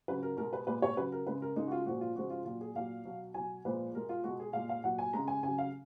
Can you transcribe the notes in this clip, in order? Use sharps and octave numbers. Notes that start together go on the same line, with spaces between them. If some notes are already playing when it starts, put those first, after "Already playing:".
C#3 F#3 B4
A#4
B2 G#3 A#4
B4
A#2 G#3 B4
C#5
C#3 F#3 B4
A#4
C#3 G#3 B4
A#4
C#3 G#3 D#4
F#4
F4
A#2 F3 G#3 F#4
F4
C#3 F3 G#3 F#4
F4
A#2 F#3 F4
G#4
A#2 F#3 F5
B2 F#3
B2 F#3 G#5
A#2 F3 G#3 B4
B2 G#3 A#4
F4
B2 G#3 F#4
G#4
A#2 G#3 F5
F5
A#2 F#3 F#5
G#5
C#3 G#3 A#5
G#5
C#3 F#3 G#5
F5